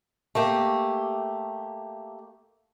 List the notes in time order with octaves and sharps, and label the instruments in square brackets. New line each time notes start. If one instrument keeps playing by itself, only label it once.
[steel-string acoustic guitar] A3 A#3 G4